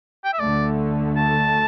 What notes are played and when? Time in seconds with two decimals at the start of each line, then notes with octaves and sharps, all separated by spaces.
0.25 G5
0.33 E5
0.40 D2 D3 A3 D5
1.16 A5